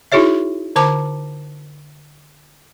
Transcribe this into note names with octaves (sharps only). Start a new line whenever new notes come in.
D#4 E4 F#4 G#4 C#5 E5
D3 C5 A5 D6